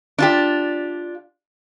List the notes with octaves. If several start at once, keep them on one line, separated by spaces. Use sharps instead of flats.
D4 F4 G4